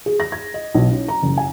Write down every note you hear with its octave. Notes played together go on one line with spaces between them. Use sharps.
G#4
A#6
G#6
D#5
B1
C#4
A#5
F#1
G#5